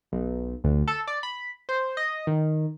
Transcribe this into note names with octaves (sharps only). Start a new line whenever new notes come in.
B1
D2
A4
D5
B5
C5
D#5
D#3